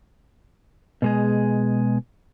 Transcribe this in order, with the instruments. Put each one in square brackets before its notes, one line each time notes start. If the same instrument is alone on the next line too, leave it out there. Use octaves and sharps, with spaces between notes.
[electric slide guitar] B2 G#3 G#4